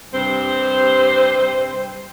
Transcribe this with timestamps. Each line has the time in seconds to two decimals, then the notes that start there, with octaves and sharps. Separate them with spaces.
0.14 G2 C3 C4 C5